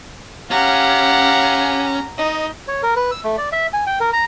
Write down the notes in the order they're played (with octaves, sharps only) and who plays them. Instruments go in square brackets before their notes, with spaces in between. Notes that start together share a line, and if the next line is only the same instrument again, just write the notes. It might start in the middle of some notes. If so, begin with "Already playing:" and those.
[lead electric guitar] C#4 [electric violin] G4 F#5 [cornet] F5 [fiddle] A#5
[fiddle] D#4 [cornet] D#5
[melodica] C#5
A#4
B4
E6
A3
D5
E5
G#5
G5
A#4
A#5